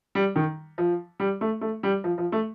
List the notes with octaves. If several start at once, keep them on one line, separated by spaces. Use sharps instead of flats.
G3
D#3
F3
G3
A3
A3
G3
F3
F3
A3